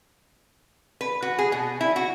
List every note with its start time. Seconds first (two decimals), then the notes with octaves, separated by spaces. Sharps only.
1.01 B4
1.22 F#4
1.39 G#4
1.52 B2
1.81 E4
1.96 F#4